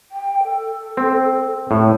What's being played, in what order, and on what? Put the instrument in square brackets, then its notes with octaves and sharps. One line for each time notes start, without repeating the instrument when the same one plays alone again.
[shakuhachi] G5
A4
[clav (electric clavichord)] C4
[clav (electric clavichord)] A2 [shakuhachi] A4